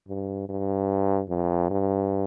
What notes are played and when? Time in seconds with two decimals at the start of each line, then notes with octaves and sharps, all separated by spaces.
0.09 G2
0.49 G2
1.29 F2
1.70 G2